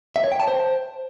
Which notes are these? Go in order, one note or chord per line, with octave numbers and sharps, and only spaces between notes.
E5
C#5
G5
A5
C5